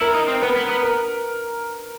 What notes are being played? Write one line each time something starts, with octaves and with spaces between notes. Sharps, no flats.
E4 A#4
D#4
C4
B3 B4
B3
B3
A#4